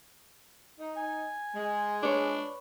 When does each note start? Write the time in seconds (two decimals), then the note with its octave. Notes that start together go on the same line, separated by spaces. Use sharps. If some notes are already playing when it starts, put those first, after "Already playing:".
0.78 D#4
0.97 G#5
1.54 G#3
2.03 D4 B4 C#5